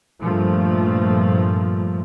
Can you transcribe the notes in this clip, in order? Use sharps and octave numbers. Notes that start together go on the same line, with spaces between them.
G2 A#2 F3 A3